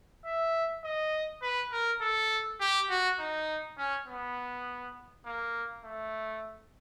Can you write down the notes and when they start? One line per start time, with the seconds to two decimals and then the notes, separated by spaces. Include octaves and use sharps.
0.25 E5
0.84 D#5
1.42 B4
1.72 A#4
2.01 A4
2.60 G4
2.90 F#4
3.19 D#4
3.78 C#4
4.08 B3
5.25 A#3
5.84 A3